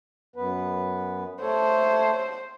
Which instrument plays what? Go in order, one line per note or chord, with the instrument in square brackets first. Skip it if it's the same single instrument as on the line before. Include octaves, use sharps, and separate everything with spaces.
[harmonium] F#2 B3 B4
[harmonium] A3 A4 C#5 [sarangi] C5